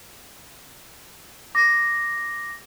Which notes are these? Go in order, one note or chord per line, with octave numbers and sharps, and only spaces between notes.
D6 A#6